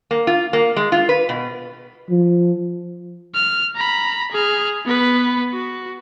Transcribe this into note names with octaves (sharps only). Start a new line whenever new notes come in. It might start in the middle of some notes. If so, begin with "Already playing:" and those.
A#3
F4
A#3
G#3
F4
B4
B2
F3
F6
A#5 B5
G#4 F6
B3 B4
F#4